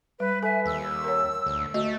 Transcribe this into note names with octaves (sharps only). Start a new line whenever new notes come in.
G3 B4
A4 E5 G#5
D#2 E6
A#4 C#5
D2
A3 F#4 D#5